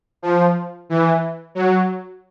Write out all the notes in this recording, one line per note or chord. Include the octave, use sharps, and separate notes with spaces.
F3
E3
F#3